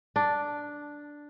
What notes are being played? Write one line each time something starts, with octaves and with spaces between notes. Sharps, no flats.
D4